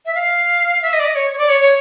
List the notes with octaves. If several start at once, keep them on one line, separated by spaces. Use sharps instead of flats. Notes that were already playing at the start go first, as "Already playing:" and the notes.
E5
F5
E5
D#5
D5
D#5
C#5
C#5
D5
C#5
C#5